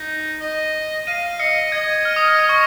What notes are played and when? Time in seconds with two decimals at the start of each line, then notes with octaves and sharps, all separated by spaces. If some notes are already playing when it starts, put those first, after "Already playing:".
Already playing: D#4
0.41 D#5
1.07 F5 D#7
1.40 D#5 C#7
1.72 D#5 G#6
2.05 F6
2.16 D#6
2.28 F6
2.39 D#6
2.49 C#6